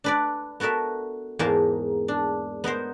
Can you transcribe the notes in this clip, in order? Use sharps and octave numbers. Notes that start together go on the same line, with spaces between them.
D4 B4 D5
B3 F#4 A4 A#4 E5
E2 G#2 A#3 A#4 A5
D4
B3 D#4 A#4 C5